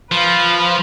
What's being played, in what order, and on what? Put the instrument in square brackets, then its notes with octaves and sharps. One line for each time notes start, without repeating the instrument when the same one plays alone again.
[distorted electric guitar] F3 [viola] B4 F5